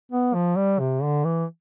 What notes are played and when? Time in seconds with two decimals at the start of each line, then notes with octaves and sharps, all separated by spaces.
0.12 B3
0.34 F3
0.57 G3
0.80 C3
1.03 D3
1.25 E3